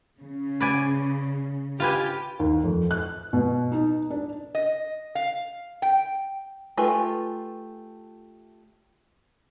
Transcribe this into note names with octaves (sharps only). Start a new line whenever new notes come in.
C#3
B4 D5 G#5
F4 G4 B4 G#5
D#2
F2
F#6
B2
D#4
D4
D#5
F5
G5
A3 F4 G4 B4 G#5